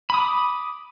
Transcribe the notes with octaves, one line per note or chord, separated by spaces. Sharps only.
B5 D6 D#6